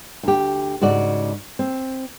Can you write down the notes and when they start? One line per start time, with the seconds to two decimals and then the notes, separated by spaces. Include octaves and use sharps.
0.23 D2 G4
0.81 G#2 C#3 F#4 D5
1.59 C4